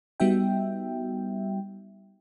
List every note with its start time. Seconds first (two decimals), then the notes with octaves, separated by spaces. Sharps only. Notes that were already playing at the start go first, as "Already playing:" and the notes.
0.20 G3 B3 D#4 F#4 E5 G5